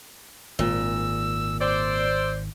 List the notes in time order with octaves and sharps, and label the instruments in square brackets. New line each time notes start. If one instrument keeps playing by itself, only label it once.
[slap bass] G#1 [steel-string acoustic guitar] A#2 [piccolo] E6
[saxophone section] C5 D5 [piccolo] E6